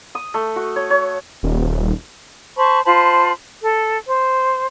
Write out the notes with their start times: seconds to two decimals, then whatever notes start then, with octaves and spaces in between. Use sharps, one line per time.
0.15 D#6
0.34 A3
0.56 F#4
0.76 C#5
0.90 C#5
1.43 D#1
2.57 C5 A5 B5 C#6
2.85 F4 C5 A5 B5
3.61 A4
4.08 C5